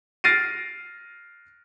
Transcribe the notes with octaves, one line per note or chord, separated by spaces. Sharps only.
F6 A6 A#6 C7 D7 D#7